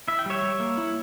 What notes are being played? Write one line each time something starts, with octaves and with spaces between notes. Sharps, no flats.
E4 E5
G5
G3 C#5 E5
G3
A#3
E4